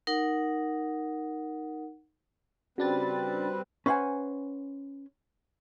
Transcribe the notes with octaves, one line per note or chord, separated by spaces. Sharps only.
D#4 A#4 F#5
C#3 G3 C4 D4 F#4 B4 A6
C#4 B4 C5 F#5 G#5